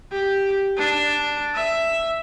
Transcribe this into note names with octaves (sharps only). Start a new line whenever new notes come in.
G4
D4
E5